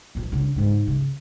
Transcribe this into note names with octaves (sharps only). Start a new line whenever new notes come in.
D1 A#2
C#3 D4
G#2 G#3
C#3